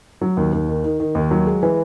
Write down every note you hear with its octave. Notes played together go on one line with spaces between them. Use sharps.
F#3
D#2
D#2
D#3
D#3
D#3
D#2
F#3
G#3
E3